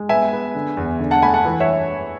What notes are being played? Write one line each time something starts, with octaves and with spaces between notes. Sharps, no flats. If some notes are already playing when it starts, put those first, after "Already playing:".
Already playing: G#3
B3 E5 G#5
B3
D3
E2
D3
F#5 A5
A3 G#5 B5
F#5 A5
E3
C#5 E5